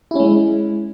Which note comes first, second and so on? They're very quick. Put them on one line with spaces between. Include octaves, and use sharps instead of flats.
E4 C#4 G#3